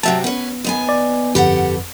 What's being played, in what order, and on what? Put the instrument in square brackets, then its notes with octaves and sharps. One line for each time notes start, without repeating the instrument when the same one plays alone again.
[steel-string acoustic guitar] C3 F#3 C4 [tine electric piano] E5 A5
[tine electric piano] B3 [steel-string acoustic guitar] C#4 B4
[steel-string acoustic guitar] D#2 B3 G#5
[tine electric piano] D5
[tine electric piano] G1 F2 B4 [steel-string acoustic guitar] G4 A4 F#5